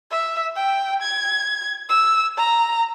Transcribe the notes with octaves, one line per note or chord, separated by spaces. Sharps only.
E5
G5
G#6
E6
A#5